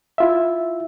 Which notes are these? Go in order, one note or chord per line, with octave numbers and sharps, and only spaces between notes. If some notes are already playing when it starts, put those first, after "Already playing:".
E4 F4 E5